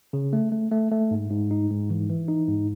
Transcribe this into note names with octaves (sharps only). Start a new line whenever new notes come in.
C#3
A3
A3
A3
A3
G#2
G#2
D#4
G#2
E3
E3
D#4
G#2